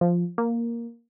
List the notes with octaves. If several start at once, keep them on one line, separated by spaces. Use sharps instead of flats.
F3
A#3